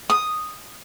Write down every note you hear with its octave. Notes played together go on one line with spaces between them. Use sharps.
D#6